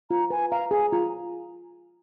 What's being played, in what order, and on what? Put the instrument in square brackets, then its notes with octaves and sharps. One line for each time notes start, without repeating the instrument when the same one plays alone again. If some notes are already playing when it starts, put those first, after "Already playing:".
[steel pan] F4 [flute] A#5
[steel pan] B4 [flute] G#5
[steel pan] F5 [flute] A#5
[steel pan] G#4 [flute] G#5
[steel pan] F4 [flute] A#5